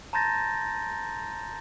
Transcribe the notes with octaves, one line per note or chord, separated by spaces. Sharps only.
A5 A#5 C6 G6 A6 A#6